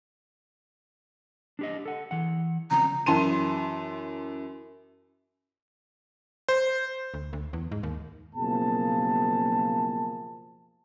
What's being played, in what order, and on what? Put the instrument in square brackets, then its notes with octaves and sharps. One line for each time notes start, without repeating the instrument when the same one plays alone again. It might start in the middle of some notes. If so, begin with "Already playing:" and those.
[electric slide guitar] D4 G4 D#5
A4 F#5
E3 F#5
[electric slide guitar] C#3 F3 C4 [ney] A#5
[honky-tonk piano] F#2 E3 A5 C6 D#7
[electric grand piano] C5
[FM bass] D2
D2
E2
G#2
D#2
[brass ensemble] F#1 B2 F3 A#3 G#4 A5